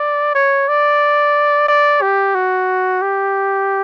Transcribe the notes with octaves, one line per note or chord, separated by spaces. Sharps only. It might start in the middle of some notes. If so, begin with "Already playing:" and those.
Already playing: D5
C#5
D5
D5
G4
F#4
G4